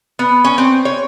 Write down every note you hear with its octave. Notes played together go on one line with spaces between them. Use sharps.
B3
C#4
C4
C#5